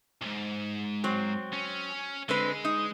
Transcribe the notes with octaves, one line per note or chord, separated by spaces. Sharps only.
B1 G#2
F#3 C4
C#4
D3 G#3 C4 B4
D#4